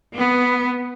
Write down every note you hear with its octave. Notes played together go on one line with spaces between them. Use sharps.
B3